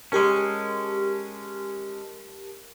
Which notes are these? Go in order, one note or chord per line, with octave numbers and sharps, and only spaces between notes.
G#3 C#4 G4 A#4 A5